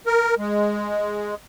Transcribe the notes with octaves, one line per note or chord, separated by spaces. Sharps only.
A#4
G#3